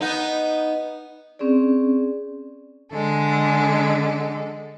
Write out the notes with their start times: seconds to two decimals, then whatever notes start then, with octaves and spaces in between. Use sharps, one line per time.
0.01 B3 D#4
1.39 C4 C#4 G#4 D5
2.91 D3 G#3 A4